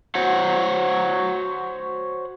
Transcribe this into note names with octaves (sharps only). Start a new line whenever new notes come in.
F#4 C5 C#5 F#5